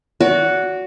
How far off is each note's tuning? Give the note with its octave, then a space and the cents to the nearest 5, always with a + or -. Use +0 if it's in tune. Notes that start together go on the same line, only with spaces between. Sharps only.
F#4 +0 D5 -40